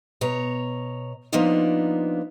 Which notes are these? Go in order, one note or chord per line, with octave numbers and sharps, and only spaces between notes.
B2 C#5 A#5
F3 A#3 B3 D4 D#4 F4